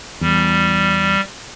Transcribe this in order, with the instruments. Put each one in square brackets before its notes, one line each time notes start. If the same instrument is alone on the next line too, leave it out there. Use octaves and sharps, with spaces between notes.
[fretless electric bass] E2 [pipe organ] G3